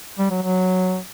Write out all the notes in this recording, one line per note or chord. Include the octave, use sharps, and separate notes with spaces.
G3
F#3
F#3